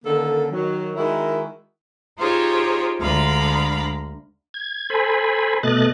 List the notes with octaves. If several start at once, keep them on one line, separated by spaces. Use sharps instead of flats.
D3 D#3 A#3 C#4 A4
D#3 F#3
D#3 G#3 E4 F#4 A#4
D#4 F4 G4 G#4 C5 C#5
D2 D3 G#3 F5 A#5 B5
G#6
A4 C5 G#5 B5
B2 A3 D#5 F#6 A6